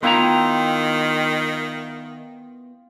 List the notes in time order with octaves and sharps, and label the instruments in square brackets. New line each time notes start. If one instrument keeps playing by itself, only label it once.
[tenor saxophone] D#3 [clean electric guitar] B3 E4 A#5 [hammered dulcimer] F4 G5 D6